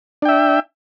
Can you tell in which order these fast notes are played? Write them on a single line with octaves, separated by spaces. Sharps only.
D4 G5 E5